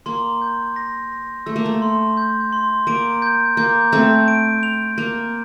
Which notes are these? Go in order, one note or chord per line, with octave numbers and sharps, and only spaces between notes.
A#3 C6
G6
A#6
A#6
A3 E6
A#3
A3
C6
G6
C6
A#3 D7
G6
A#3 G6
A3 C4 G6
D7
F7
A#3 F7